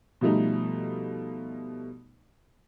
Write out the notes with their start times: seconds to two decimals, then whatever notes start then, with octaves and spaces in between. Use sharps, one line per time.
0.21 B2 F3 G3 A3 D#4